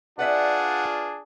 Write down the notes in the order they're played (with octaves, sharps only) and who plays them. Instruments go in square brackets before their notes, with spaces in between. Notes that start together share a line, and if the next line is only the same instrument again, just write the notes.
[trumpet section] D4 F4 G#4 [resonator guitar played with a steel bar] B4 D5 E5 [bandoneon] F#5